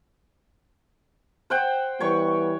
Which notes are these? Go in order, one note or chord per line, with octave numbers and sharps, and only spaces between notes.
C5 F#5 G5
E3 G3 B3 C#5 C#6